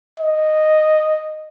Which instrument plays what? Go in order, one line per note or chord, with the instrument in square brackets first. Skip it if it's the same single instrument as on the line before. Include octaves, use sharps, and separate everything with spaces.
[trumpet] D#5